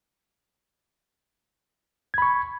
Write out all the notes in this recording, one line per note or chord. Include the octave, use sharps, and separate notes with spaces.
B5 C#6 G#6